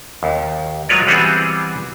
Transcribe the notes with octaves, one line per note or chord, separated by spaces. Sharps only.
D#2
F#3 G#3 F4 B4 C#5 D5
E3 G3 B3 C4 F#4 G#4